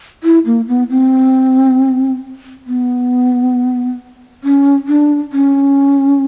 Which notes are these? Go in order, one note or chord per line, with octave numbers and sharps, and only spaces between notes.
E4
A#3
B3
C4
B3
C#4
D4
C#4